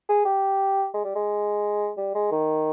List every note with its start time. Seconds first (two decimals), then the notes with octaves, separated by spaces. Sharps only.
0.09 G#4
0.25 G4
0.94 G#3
1.04 G3
1.15 G#3
1.98 G3
2.15 G#3
2.31 D#3